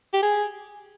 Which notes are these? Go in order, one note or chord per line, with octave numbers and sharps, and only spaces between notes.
G4
G#4